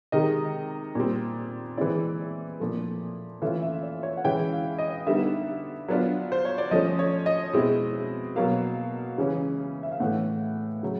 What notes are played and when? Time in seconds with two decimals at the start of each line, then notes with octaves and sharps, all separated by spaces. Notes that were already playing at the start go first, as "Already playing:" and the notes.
0.12 C3 D#3 G#3 D#5
0.95 A#2 G3 C4
1.78 E3 G#3 C4 E4 D5
2.60 A#2 F3 A3
3.42 E3 A3 C#4 F4 E5
3.62 E5
3.83 D5
4.03 C#5
4.17 F#5
4.24 E3 G#3 C#4 E4 G5
4.52 F5
4.78 D#5
5.06 D3 G3 B3 D#4 E5
5.88 F#3 B3 D4 F4
6.32 C5
6.45 C#5
6.58 D5
6.71 F3 A3 C#4 D#5
6.99 C#5
7.26 D#5
7.53 B2 G#3 C4 E4
8.36 B2 F#3 A#3 F5
9.18 C#3 E3 G#3 C#4
9.83 E5
9.92 F5
10.00 A2 E3 A3 F#5
10.83 C#3 F#3